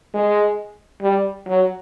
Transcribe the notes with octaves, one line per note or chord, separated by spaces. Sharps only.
G#3
G3
F#3